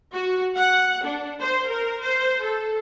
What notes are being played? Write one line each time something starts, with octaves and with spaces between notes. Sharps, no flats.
F#4
F#5
D4
C5
A#4
C5
A4